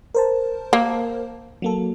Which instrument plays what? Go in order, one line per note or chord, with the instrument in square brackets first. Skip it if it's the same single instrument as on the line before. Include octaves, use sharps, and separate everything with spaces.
[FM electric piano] A#4 C5 A5
[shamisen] A#3
[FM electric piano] F#3 A#3 A4